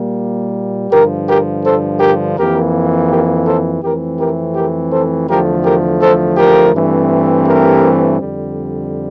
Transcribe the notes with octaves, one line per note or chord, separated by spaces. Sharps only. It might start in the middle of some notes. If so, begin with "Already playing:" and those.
Already playing: A#2 G3 A#3
G2 D3 F3 G4 A#4
G4 A#4
A4 C5
G4 A#4
F2 E3 A#3 G4 A#4
G4 A#4
A4 C5
F2 E3 A3 C4 G4 A#4
G4 A#4
G4 A#4
A4 C5
E2 D3 F3 A3 G4 A#4
G4 A#4
A4 C5
G4 A#4
G2 E3 A3 C4
G4 A#4
F2 D3 G3